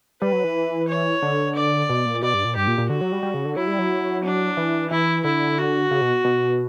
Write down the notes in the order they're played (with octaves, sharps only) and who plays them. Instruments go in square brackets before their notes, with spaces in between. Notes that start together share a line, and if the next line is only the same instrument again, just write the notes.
[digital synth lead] G3 [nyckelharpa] B4
[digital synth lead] F#3
E3
[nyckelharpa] C#5
[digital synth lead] D3
[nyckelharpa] D5
[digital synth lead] B2
A#2
[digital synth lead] B2 [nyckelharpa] D5
[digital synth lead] G2
A#2
[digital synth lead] G2 [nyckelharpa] G4
[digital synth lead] A#2
A#2
[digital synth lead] D3 [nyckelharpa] F#4
[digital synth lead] F#3
G3
G3
C#3
D3
[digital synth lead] F#3 [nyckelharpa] E4
[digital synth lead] G3
F#3
[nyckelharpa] D4
[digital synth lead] E3
[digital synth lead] E3 [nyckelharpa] E4
[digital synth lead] D3 [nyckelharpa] E4
[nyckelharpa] F#4
[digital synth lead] C#3
B2
B2